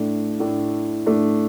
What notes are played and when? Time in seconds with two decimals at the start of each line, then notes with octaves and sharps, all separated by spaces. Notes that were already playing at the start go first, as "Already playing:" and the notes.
Already playing: A2 A3 D4
0.40 A2 A3 D4
1.06 A2 A3 D4